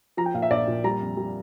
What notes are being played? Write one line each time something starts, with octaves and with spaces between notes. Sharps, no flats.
F3 A#5
G5
A#2 F5
E5
A#1 D5
A#2
G3 A#5
F2
G3